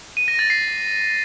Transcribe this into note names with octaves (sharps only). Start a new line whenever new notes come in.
D#7
A#6
A6
C7